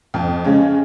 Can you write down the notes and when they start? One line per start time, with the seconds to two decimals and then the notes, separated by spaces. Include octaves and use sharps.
0.14 F2
0.45 C#3 G#3 C#4